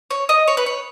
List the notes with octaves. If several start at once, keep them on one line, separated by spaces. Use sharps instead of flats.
C#5
D#5
C#5
B4
C#5